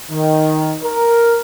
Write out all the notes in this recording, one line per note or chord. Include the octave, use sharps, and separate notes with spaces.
D#3
A#4